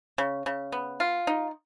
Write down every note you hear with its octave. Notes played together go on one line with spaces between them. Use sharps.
C#3
C#3
B3
F4
D#4